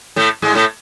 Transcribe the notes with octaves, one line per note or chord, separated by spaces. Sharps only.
A2 A3
G#2 G#3
A2 A3